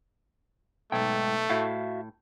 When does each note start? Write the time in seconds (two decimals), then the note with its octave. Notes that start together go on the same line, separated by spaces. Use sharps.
0.92 B1 G#2 A3 G5
1.50 A2 F#4 E5 F5